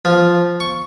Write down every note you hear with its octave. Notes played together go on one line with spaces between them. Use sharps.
F3
C#6